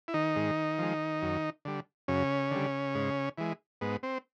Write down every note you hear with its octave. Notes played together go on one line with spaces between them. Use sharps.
E4
D#3 D#4
G#2
F3 G#3
F#2
D3 G3
F#2 C#3 C#4
D3 G3
G#2
E3 G#3
G#2 B3
C4